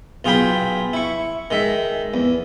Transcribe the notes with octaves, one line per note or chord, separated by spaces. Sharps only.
B1 F4 G#4 G5 B5 C6
E4 C#6
D#3 G#3 E5
E2